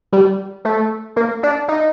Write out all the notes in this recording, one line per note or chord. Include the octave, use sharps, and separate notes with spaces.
G3
A3
A#3
D4
D#4